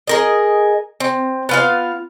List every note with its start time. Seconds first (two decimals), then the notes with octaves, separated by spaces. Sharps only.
0.07 G#4 A#4 D#5
1.00 C4
1.49 B3 F4 F5